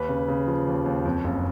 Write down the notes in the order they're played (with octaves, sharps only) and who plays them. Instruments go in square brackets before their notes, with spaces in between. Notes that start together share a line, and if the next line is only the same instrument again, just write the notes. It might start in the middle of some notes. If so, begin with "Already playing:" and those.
Already playing: [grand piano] D#2 B4
C#3
C#3
F3
D#2
D#2
F2
F#1